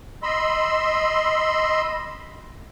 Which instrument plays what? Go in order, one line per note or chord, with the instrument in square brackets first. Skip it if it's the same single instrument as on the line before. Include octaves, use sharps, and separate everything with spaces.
[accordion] D#5 B5 C6 E6